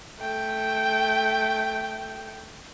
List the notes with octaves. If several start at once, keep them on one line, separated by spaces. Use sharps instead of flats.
A3 G5